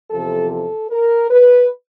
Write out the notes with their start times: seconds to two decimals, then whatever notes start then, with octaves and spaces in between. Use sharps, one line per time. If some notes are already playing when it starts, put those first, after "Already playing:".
0.10 E2 C3 F3 A4
0.51 A4
0.91 A#4
1.30 B4